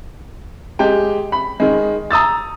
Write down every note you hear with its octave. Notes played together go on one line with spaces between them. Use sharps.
G#3 G4 G5
B5
D#3 G#3
A#5 D#6 E6 A6